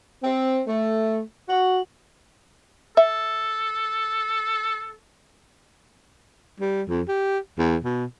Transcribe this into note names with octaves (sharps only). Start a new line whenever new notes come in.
C4
A3
F#4
A4 E5
G3
F2
G4
E2
B2